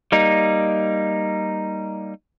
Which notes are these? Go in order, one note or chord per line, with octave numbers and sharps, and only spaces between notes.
G3 A#3 D#4